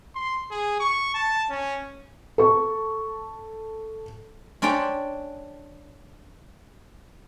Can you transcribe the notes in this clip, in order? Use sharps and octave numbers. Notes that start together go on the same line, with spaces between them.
C6
G#4
C#6
A5
C#4
A4 C#6
C#4 D4 C5 D5 G5